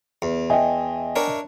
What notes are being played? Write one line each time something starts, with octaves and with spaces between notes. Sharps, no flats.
E2
D#5 E5 G5 G#5
D4 A#4 C#5